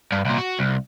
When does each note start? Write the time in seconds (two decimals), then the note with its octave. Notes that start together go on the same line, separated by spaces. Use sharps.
0.12 G2
0.25 C2 A#2
0.38 F#4
0.59 C2